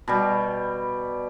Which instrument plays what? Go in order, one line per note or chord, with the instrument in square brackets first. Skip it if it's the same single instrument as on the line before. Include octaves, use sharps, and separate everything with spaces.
[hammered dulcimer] B2 G3